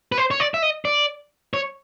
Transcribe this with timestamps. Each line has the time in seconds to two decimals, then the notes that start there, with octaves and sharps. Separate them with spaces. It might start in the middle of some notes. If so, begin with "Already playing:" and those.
0.12 B4
0.18 C5
0.31 C#5
0.40 D5
0.54 E5
0.62 D#5
0.85 D5
1.54 C#5